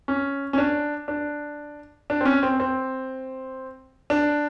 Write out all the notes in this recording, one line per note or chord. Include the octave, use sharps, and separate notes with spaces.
C#4
C#4
D4
D4
D4
C4
C#4
C4
C4
D4